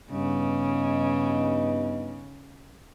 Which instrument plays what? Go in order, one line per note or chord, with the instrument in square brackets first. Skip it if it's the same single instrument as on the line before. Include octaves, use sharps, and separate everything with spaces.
[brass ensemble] G2 B3 D#4 [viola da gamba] C#3